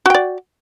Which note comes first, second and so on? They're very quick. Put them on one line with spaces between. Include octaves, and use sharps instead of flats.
F#4 G5 D5